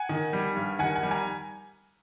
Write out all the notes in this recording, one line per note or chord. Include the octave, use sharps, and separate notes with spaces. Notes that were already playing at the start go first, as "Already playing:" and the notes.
Already playing: F#5 G#5
D#3
G3
G2
D#3 F#5 G#5
F#5 G#5
G3
G#5 A#5